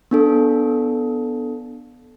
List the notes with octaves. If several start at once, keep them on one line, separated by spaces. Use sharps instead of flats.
B3 D4 A4